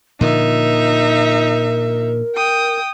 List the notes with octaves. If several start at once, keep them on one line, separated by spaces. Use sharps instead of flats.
A#2 D3 F3 D#4 A#4 E5
G5 D#6